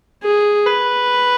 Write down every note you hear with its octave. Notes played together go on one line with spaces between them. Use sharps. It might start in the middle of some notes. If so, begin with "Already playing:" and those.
G#4
B4